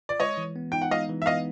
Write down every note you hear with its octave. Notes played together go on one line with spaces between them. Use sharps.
D5
G#3 C#5 D#5
E3
B3
D#4 G5
F#5
G#3 D#5 F5
E3
E5
B3 D#5 F5